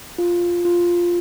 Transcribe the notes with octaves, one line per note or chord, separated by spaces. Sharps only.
F4
F4